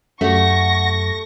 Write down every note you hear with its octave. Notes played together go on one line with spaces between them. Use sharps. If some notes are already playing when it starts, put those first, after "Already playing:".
F#2 A3 G4 F#5 C#6 A#6